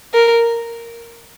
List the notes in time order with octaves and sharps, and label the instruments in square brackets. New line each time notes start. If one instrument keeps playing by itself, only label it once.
[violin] A#4